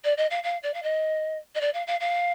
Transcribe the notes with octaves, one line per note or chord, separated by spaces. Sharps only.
D5
D#5
F5
F5
D5
F5
D#5
D#5
D5
F5
F5
F5